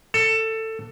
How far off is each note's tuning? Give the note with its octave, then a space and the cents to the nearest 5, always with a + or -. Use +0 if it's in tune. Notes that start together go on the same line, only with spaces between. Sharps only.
A4 +15